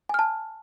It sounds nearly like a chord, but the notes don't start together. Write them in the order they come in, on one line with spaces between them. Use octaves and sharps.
G#5 F6 A5